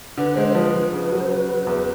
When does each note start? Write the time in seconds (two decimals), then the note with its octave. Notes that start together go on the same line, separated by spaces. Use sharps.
0.17 D3 B4
0.36 G#3 C5
0.55 F3 B4
0.74 F3
0.93 C#3
1.05 B4
1.12 F#3
1.18 C5
1.29 C#3 B4
1.48 F#3
1.67 E2